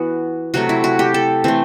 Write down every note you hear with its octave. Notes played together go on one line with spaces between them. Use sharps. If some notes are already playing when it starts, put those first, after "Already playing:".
Already playing: E3 B3 F#4
C3 F#3 A3 F#4
E4
F#4
G4
A4
E3 A3 C4